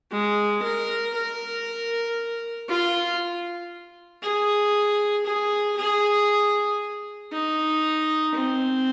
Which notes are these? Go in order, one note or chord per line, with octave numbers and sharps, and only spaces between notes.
G#3
A#4
A#4
F4
G#4
G#4
G#4
D#4
C4